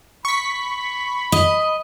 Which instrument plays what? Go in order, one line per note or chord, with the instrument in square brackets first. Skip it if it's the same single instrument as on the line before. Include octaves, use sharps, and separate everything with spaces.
[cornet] B5 [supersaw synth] C#6 B6
[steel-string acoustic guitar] D#5